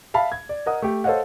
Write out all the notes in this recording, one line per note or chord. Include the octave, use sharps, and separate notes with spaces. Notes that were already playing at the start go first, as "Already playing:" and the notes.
E5 F5 A5 B5
G#6
D5
A#4 D#5 F#5 D#6
A3 G4
A4 C5 C#5 D#5 F5 F#5